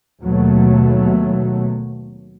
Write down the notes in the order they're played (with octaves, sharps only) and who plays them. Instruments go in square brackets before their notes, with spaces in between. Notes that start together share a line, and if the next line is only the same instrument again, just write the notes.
[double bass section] D#2 B2 F#3 A3